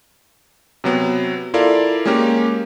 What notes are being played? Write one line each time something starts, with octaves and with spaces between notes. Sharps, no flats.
C3 F#3 B3
E4 F4 A4 A#4 D5 F5
G#3 A#3 C#4 G4 A#4